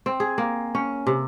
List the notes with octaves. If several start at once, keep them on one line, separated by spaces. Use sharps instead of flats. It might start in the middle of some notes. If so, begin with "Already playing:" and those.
C4
G#4
A#3
C#4
C3